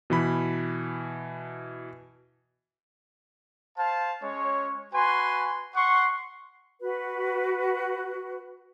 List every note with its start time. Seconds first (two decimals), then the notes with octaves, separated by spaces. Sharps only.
0.10 B2 E3 B5
3.77 C5 F5 A5
4.22 G#3 C#4 C#5
4.93 F#4 B4 G#5 C6
5.76 F#5 C6 C#6
6.81 F#4 B4